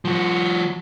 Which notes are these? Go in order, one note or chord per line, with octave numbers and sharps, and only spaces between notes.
F3 F#4